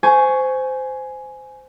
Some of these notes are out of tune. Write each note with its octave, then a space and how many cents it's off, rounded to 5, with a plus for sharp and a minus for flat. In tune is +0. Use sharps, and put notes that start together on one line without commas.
C5 -15 G#5 +10 C#6 +5